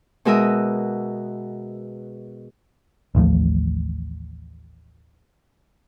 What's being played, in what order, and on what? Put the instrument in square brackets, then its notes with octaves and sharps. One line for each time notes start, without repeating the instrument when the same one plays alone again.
[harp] B2 G#3 F#4 A#4 E5 D#6
[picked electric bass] A1 D#2 F3 A3